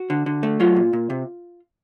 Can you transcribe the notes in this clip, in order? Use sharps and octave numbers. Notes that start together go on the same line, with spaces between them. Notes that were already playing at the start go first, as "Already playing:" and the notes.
Already playing: F#4
D3
D3
A3
F#3 F4
A#2
A#2
C3